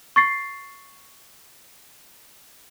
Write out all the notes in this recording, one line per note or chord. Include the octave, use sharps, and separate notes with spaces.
C#6 A6 C7